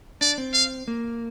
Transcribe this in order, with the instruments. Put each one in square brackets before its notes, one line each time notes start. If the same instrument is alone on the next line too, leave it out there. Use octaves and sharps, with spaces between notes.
[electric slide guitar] D4 [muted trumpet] D5
[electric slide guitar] C4
[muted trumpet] F5
[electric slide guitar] A#3